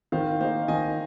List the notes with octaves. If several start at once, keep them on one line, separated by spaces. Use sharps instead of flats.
D#3 C5 F5
A#3 D#4 C5 F5
D#3 D#5 G#5